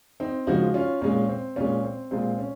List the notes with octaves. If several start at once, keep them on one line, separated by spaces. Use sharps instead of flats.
C4 D#4
C#3 F3 G#3 D#4 F#4
C#4 F4
A#2 G#3 C#4
C4
A#2 G#3 C#4
C4
A#2 G#3 C4
C#4